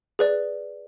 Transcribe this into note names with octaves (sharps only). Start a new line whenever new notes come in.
G#4 B4 D5